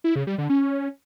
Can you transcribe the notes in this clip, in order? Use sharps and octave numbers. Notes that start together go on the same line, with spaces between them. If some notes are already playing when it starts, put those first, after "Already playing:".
E4
C#3
G3
D3
C#4